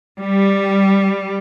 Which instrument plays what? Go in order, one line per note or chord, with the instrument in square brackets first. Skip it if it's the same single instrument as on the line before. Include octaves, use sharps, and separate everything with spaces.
[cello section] G3